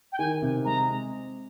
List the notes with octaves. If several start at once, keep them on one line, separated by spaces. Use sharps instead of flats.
G5
D#3 G#5
C3
G#3 A#5
C4